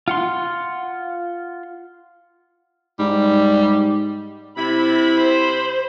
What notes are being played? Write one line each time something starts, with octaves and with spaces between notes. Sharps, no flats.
F4 F#5 C6
G#2 G3
C3 E4 B5
C5